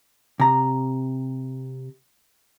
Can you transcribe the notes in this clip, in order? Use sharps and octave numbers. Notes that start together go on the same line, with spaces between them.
C3 A#5